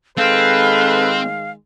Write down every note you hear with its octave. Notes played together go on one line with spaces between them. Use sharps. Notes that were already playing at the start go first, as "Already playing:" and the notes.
D#3 G#3 C4 A4 B4 F5